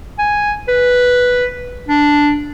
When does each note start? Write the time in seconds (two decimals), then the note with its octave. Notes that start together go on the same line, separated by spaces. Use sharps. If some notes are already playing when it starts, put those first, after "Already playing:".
0.19 G#5
0.69 B4
1.89 D4